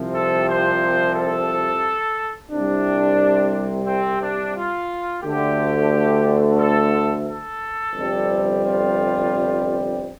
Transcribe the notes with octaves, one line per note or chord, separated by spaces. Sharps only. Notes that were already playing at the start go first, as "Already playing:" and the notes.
Already playing: C2 C3 F3
A4
C5
A4
C2 C3 G3 D4
C4
D4
F4
D2 D3 A3 G4
A4
A4
G1 F2 C3 G3
F4